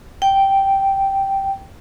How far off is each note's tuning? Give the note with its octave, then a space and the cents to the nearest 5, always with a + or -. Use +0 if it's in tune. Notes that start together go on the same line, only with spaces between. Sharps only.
G5 -5